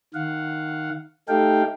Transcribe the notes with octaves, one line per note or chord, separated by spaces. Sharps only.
D#3 F5 F#5
A3 D#4 G4 A4 F5 G5